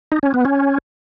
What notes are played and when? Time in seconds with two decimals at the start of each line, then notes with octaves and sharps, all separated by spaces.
0.12 D#4
0.23 C#4
0.34 B3
0.45 C#4